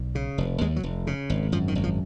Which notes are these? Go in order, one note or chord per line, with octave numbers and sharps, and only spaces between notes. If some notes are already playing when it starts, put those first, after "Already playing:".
Already playing: B1
C#3
F1
D#2 G#3
F#3
F1
C#3
G#1
F#2 F3
D#3
G#1
F3